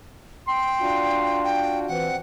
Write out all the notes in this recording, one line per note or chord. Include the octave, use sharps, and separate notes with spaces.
G5 C6
D4 F4 F#4
G5
E3 C4 F#5